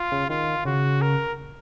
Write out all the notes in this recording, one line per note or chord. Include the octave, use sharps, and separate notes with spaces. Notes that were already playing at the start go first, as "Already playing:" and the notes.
Already playing: F4
C#3
D#3 F4
C#3 F#4
A#4